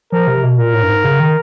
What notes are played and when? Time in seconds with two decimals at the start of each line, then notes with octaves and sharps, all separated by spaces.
0.12 F3 A#4
0.27 C3
0.43 B2
0.58 A#2 A#4
0.74 A2
0.83 G2
0.90 G#2
1.04 C#3
1.20 D#3